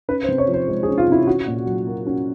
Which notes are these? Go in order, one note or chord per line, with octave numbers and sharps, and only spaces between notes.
C#4 B4
C5
C3
C#5
F3
C5
G#3 C5
G#4
C#4
F4
C3 E4
C#4 F#4
A#2
F#3
A#3
C#4